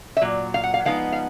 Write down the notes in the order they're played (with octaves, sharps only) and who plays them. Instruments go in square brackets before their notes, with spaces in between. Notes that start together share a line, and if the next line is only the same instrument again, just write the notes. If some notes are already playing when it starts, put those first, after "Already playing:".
[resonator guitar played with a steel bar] E5
A#2 F#3
F5
F#5
F5
F3 G#3 B3 D#4 F5
F5